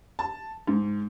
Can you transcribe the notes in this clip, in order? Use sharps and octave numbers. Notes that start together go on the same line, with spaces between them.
A5
G#2